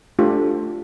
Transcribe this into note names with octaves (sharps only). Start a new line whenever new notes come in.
A3 D4 F4 G4